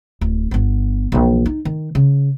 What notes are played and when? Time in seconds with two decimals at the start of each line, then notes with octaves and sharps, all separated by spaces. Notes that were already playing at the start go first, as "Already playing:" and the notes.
0.21 D1
0.51 G1 B3
1.12 A#1 E3
1.46 D#4
1.65 D#3
1.95 C#3